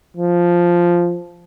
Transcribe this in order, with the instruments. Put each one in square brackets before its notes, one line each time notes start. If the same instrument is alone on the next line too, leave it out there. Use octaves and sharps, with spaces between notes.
[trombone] F3